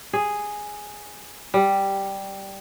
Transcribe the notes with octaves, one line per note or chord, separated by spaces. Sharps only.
G#4
G3